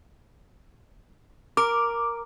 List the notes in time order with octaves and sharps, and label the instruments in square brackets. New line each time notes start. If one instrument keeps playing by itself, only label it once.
[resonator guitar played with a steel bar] A#4 [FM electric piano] D6